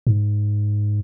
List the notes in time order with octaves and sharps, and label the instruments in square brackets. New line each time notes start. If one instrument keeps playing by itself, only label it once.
[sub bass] G#2